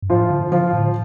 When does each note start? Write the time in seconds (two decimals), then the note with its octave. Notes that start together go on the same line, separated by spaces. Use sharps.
0.02 G2
0.10 A2 F3 F4
0.30 D3
0.52 D3 F3 F4
0.73 A2